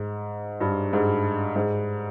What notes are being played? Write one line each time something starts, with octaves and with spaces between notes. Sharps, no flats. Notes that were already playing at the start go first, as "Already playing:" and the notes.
Already playing: G#2
G2
G#2
G#2